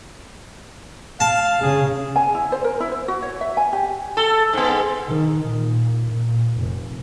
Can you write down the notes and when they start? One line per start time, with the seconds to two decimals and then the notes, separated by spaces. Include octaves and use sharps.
1.20 F5 A5
1.61 C#3 G#4
2.16 G#5
2.34 E4
2.52 C5
2.64 A#4
2.80 E4
2.91 C5
3.08 F#4
3.22 C#5
3.41 E5
3.57 G#5
3.73 G4
4.17 A4
4.53 G#2 B3
5.09 D#3
5.47 A#2
6.08 A#2
6.59 F1